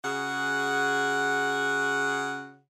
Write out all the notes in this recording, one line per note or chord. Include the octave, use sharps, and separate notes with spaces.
C#3 F#4 G#4 F#5